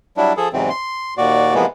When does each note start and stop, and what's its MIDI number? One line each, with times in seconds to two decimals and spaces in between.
0.17 0.33 54
0.17 0.33 55
0.17 0.33 62
0.17 0.33 64
0.37 0.48 53
0.37 0.48 68
0.37 0.48 69
0.53 0.70 40
0.53 0.70 44
0.53 0.70 48
0.53 0.70 52
0.53 0.70 54
0.53 0.70 60
0.70 1.14 84
1.17 1.54 39
1.17 1.54 46
1.17 1.54 66
1.17 1.54 74
1.54 1.66 48
1.54 1.66 52
1.54 1.66 53
1.54 1.66 56
1.54 1.66 58
1.54 1.66 59